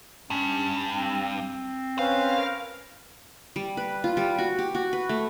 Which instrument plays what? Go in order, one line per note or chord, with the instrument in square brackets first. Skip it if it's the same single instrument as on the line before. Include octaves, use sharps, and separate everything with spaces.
[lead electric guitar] G2 [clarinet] C#4
[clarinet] C4
[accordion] C#4 B4 C5 [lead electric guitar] F5
[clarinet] A#4
[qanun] G3
B4
F4
G3
F#4
G4
F#4
B4
A3